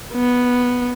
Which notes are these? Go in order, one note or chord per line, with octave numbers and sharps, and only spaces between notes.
B3